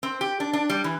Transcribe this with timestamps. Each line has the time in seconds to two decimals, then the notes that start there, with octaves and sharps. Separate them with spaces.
0.03 C4
0.21 G4
0.40 D4
0.53 D4
0.70 G3
0.84 E3